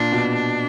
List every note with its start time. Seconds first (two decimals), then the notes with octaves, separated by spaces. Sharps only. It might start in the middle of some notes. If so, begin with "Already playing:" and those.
Already playing: A#2 D4
0.12 B2
0.36 D4